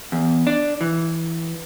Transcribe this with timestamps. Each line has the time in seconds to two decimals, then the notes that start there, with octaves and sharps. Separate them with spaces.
0.12 E2
0.47 D4
0.81 E3